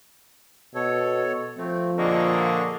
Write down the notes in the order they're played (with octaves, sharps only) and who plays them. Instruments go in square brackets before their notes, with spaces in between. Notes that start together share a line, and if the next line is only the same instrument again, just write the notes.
[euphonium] B2 [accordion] A4 C#5
[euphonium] F3 [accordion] A3 C4
[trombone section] A#2 D3 A#3 [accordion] G#4 D#5 C#6